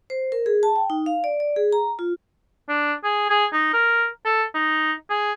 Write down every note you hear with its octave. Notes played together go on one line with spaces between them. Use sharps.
C5
A#4
G#4
A5
G5
D#4
F5
D5
D5
G#4
A#5
F4
D4
G#4
G#4
D#4
A#4
A4
D#4
G#4